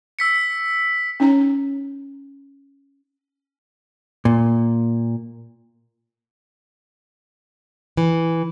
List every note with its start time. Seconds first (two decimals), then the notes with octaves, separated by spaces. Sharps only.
0.19 E6 B6 C#7
1.20 C#4 D#4 C#5 A#5
4.25 A#2
7.97 E3